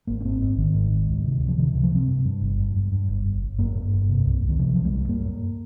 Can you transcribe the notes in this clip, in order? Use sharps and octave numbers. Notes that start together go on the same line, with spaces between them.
G#1 A#3
C#4
G#2 C4
G#1 C4
G#1 D#3
G#2
G#2
C#2
C3
C#2
F3
C3 D#3
F3
C3
F3
C3 C4
G2
G2
G1
G2
G2
G2
G1
G1
G1
G2 A#3
G2
G1
C3
C2
C2
D#3
C3 F3
C2 F3
G#3
C2 G3
G2 A#3
G2